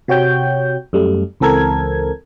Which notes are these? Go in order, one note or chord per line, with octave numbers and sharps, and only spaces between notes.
C3 F#4 C#5 G5 G6
F#2 G3 A3
C#2 E3 C4 A4 A#4 G#6